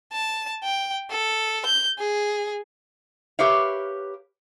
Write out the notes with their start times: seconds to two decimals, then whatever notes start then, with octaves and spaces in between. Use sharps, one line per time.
0.13 A5
0.63 G5
1.10 A4
1.66 G6
1.98 G#4
3.39 G4 A#4 B4 C#5 E5 F5